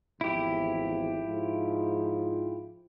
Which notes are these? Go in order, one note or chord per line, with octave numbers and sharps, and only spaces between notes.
G#1 E2 F3 E4 G4
G#2 F3 F4